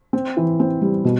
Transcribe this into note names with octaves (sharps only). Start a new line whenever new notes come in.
C4
E3
C4
G3
B2